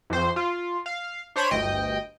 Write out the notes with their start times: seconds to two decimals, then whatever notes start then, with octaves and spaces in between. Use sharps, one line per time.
0.10 F2 C5
0.36 F4
0.86 F5
1.36 D4 C5 C#5 B5 D#7
1.51 G1 D2 D#5 G5